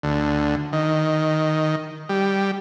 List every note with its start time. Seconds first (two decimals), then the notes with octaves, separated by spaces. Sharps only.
0.03 D2
0.73 D#3
2.09 G3